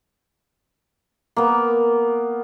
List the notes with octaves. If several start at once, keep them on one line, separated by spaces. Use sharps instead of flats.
A#3 B3